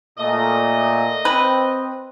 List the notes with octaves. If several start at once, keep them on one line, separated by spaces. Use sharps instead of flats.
A#2 A3 D#5
C4 B4